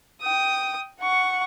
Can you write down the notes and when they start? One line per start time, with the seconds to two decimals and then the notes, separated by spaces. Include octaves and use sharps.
0.22 G5 D#6
1.01 F#5 C#6